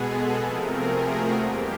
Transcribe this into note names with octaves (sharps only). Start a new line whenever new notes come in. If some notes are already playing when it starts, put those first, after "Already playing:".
Already playing: B2 G#3 B3 G#4 A4
C3 F3 A3 C4 A#4
G#4
F#4
E2 B2 G3 A#3 G4